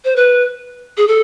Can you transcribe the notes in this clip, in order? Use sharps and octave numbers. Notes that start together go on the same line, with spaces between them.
C5
B4
G#4
A4